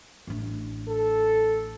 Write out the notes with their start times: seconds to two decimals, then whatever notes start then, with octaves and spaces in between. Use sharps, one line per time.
0.27 A1 D4
0.88 A4